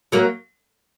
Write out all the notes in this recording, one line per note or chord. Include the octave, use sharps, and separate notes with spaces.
F#3 A#3